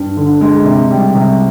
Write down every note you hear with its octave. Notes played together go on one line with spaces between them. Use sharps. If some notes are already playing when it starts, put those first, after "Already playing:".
Already playing: G2
D3
G#3
C3
G3
C3